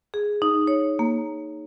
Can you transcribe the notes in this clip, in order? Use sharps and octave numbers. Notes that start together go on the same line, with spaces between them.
G#4
D#4
C#5
A#3